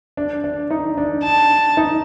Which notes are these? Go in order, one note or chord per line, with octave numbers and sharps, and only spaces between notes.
D4
D4
D#4
D4
A5
D#4